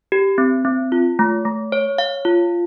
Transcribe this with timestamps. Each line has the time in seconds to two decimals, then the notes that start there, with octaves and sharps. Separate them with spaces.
0.12 G4
0.38 C4
0.65 C4
0.92 F4
1.19 A3
1.45 A3
1.72 C#5
1.98 F5
2.25 F4